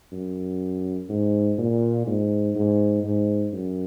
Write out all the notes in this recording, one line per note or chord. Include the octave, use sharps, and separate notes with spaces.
F#2
G#2
A#2
G#2
G#2
G#2
F#2